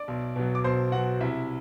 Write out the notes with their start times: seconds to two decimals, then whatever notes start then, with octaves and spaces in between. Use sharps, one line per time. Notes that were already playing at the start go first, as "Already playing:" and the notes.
Already playing: D5 D6
0.08 B1
0.36 B2 F#3
0.55 D6
0.64 B1 C5 C6
0.92 B2 F#3 F#4 F#5
1.20 C2 E4 E5